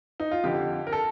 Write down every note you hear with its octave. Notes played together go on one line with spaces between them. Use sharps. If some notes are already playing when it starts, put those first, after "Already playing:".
D#4
F4
F2 D3 F3 G4
A#4
A4